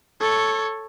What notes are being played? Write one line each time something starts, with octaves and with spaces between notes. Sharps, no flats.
A4 C#5